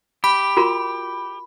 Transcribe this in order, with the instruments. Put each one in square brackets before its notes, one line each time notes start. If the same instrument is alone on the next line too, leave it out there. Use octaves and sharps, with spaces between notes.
[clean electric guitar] G4 [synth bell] B5
[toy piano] F4 F#4 A#4